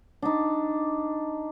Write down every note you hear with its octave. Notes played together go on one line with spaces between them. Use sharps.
D4 D#4